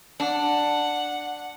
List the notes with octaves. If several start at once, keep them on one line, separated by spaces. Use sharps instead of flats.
D4 F#5